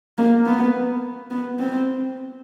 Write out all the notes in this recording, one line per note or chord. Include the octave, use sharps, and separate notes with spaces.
A#3
B3
B3
C4